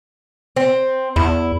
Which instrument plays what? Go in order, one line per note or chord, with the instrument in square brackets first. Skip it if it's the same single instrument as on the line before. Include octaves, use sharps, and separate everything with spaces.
[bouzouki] C4
[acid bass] E2 [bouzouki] E4